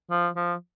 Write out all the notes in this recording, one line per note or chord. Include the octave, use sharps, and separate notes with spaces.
F3
F3